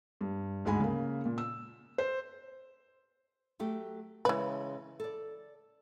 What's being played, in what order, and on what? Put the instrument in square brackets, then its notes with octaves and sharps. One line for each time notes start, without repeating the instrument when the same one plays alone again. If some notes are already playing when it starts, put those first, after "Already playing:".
[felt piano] G2
D2 G#2 G#3 G#5 B5
C#3 A#3
A#2
E6
C5
[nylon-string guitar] F#3 A3 G4
[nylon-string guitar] C#3 G#3 [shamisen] E3 B4
[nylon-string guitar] A4 D5